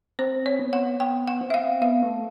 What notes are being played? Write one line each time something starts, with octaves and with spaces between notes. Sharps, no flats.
C4 C5
C#5
B3
F#5
B3 G5
F#5
C4
E5
F5
B3 F5
A3